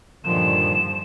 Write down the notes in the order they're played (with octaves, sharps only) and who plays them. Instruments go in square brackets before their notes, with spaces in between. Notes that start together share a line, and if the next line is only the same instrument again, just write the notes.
[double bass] G2 F3 [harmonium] A#2 D3 D#3 [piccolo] E7